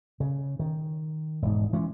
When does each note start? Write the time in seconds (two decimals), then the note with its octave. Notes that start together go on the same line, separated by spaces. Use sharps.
0.20 C#3
0.59 D#3
1.42 E1 G#2
1.73 E3 G#3 C#4